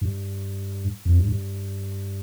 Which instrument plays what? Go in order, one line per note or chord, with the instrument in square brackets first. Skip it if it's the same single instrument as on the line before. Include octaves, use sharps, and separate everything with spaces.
[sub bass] G2
F2
G2
G2